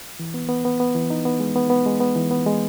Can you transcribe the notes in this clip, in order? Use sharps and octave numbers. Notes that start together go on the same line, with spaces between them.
E3
B3
B3
B3
B3
E3
D#4
B3
G#3
B3
B3
G#3
B3
E3
B3
G#3